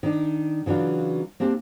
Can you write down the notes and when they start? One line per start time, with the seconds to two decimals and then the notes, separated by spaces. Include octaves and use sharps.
0.03 D#3 D4
0.66 C#3 E3 F#3 D4 F4
1.40 A#3 C4 D4 G4